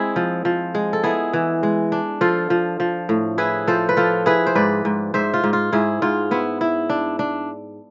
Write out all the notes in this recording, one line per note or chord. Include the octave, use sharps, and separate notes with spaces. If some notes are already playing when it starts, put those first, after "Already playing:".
Already playing: G#3 C4 E4 G#4
F3
F3
G#3
A4
B3 E4 G#4
E3
G#3
D4
F3 F4 A4
F3
F3
A2
E4 G#4 B4
F3 A4 C5
B4
F3 F4 A4
E4 G#4 B4
C5
G#2 B4 D5
G#2
G#2 C5 E5
F4
G#2
F4
G#2 E4 G#4
G#2 F4
B3 E4
E4
D4
D4